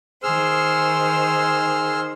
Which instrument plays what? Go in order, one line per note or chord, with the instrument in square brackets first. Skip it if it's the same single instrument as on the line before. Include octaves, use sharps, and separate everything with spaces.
[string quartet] D#3 C5 [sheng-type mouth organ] G#4 E6 F6